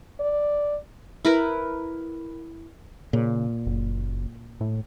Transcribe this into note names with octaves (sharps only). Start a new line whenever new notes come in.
D5
E4 A#4 B4
A#2 C#3
F#1
A2